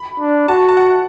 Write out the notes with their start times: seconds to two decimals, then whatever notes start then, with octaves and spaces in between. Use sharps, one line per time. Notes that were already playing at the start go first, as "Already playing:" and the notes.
Already playing: B5
0.20 D4
0.48 F#4 A5
0.69 A5
0.77 F#5